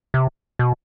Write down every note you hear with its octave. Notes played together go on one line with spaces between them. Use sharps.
C3
B2